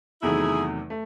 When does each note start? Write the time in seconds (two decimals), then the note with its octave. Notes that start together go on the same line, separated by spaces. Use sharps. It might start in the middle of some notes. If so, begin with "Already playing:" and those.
0.22 E2 C3 D#3 F#3 A3 E4 G#4
0.90 A3